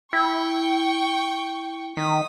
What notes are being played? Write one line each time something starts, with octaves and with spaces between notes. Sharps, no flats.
E4 G5 C#6
D#3 D#6 B6